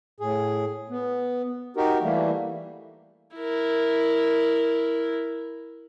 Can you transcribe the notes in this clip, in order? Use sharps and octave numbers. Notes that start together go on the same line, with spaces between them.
A2 G#4
B3
D#4 F#4 G4 A#4
E3 G3 A3 A#3
E4 A#4